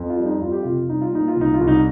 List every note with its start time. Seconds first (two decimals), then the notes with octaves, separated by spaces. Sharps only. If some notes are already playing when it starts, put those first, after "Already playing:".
Already playing: F2
0.10 F4
0.17 G3
0.25 D#4
0.41 F2 F4
0.52 G4
0.63 C3 F4
0.89 G3 D#4
1.01 F4
1.12 A#2 D#4
1.28 F4
1.36 C2 D#4
1.54 F4
1.61 C2
1.67 D#4